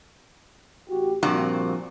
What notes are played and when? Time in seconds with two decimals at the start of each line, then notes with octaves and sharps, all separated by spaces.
0.90 A1 F#4 G4
1.23 G2 A#2 F3 C4 F#4